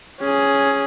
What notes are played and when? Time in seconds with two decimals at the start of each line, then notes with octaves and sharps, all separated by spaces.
0.21 C#4 G#4